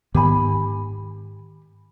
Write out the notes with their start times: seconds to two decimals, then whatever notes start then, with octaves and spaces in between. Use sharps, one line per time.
0.14 G#2 D#3 B3 G4 G#5 B5